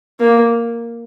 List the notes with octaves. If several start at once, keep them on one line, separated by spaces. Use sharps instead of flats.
A#3